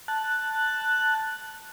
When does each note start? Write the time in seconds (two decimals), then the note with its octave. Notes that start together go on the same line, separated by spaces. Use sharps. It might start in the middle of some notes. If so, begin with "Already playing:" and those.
0.08 A5 F#6